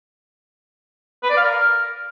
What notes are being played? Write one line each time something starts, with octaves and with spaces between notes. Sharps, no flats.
B4
D5
F5
A#4